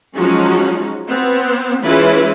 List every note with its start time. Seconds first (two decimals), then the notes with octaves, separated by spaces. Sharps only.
0.15 F3 F#3 G#3 C#4 D#4 F#4
1.09 B3 C4
1.84 E3 G#3 C#4 E4 F4 B4